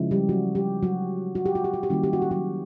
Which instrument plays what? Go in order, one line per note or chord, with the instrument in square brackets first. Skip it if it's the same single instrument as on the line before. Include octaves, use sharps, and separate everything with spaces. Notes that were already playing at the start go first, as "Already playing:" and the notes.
Already playing: [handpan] C#3 F3 G#3 C#4 E4
G3 G4
F#3 F#4
G3 G4
F#3 F#4
F#4
G4
F#4
G4
F#4
G4
D#3 G3 A#3 C#4 E4 F#4
G4
F#4
G4
F#3 F#4